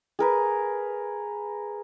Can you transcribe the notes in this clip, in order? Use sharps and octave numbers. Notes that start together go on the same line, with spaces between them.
G#4 A#4 B4